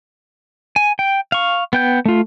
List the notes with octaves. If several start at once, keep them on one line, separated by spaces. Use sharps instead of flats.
G#5
G5
F5 C#6
B3 G5 G6
A3 F4